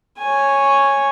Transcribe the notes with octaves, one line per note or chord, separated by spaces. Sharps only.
C#5 G#5